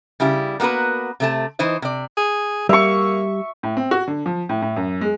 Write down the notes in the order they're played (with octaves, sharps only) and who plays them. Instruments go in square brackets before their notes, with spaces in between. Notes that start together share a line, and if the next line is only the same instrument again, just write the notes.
[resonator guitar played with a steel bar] C#3 G3 E4 G4
A#3 B3 F#4 A#4 B4
C3 A3 A5
E3 D#4 C5 D#5
C3 D5
[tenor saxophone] G#4
[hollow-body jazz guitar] G3 [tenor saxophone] A#3 [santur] E5 C#6
[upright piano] A2
C4
F#4
D3
F3
A2
A2
F#2
G#3